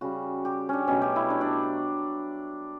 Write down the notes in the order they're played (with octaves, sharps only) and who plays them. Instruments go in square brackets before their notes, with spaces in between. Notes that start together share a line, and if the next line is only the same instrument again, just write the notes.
[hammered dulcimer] C#3 G3 F#4
G4
C#4 D4
B2 F#3 A3 C#4
G4
E4
D4
D4